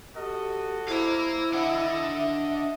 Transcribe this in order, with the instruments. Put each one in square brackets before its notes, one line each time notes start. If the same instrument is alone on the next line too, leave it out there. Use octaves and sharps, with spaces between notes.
[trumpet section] F#4 A4 D#5 [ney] G4
[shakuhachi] E4 [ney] C5 [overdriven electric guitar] F5 A#5
[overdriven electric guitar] D4 F#5 [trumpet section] D#5 [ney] E5